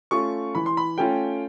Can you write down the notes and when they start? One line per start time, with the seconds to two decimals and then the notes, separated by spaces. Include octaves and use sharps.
0.11 A3 C#4 F4 C#6
0.55 E3 B5
0.66 C6
0.77 B5
0.98 A3 C#4 F4 G5